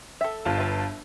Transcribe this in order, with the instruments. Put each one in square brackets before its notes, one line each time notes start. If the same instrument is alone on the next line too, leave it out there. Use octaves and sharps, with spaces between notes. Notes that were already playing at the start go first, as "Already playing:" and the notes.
[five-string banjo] A4 E5
[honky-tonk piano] G1 F4 A5
[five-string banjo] B4 E5